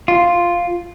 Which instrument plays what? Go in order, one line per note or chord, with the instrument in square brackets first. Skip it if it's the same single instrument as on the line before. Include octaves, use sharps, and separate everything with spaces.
[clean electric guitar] F4